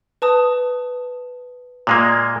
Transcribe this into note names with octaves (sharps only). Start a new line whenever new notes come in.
B4 A5 D#6
A#2 G#3 A#3